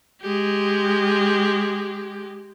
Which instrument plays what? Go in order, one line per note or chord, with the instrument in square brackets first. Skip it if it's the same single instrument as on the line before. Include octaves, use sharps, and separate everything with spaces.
[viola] G#3 G4